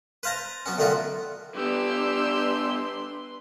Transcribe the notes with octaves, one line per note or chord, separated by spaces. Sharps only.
B4 C5 F5 A5 A#5
F#3 B3 C#4
D3 D#3 A3 B3 F4 F#4
G2 B3 D4 G4 B4 C6 E6